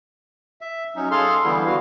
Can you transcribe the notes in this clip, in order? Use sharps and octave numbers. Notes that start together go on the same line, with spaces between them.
E5
F#3 C#4 D#4
G#4 A4 F5 C6 F6
D3 E3 G3 B3 E4
F#4 F5